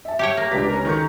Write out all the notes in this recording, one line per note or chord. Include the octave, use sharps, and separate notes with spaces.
E5 A5
G4 C#5 G5
A#3 A#5
C#2 D4 G4 B4 B6
C#4 A#4
D#3 A4 C#6 G6